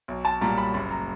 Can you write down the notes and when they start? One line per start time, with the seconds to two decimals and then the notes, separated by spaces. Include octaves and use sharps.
0.08 B1
0.25 A5
0.41 A#2 G3 A#5
0.58 B5
0.74 F#1 B5
0.91 A#5